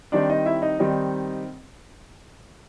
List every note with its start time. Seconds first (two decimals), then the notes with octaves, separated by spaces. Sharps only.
0.12 D#3 G3 C4 D4 D#4 D5
0.29 D#4 D#5
0.46 E4 E5
0.62 D#4 D#5
0.79 D#3 G3 C4 D#4